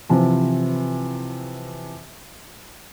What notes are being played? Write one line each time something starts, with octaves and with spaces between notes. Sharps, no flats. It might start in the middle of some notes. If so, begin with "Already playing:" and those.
C3 E3 F3